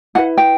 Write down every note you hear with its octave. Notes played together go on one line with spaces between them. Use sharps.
E4 B4 F#5
G5